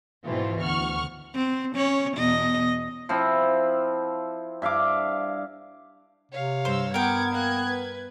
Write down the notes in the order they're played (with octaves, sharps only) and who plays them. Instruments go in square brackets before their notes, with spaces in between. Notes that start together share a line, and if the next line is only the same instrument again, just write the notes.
[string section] G#2 B2 E3 A3 C4 F4
D2 F#5 C#6 F6
[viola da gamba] C4
C#4 C#5
E2 B2 D#5
[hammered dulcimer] F3 C4 E4
G2 E5 F5 D6
[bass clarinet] C3 [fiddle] C#5 F5
[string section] G2 E6 [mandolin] C5
[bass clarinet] B3 [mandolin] A#4 G5 [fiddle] F#5 D6 [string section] G#6
[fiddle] A#3 F#6
B4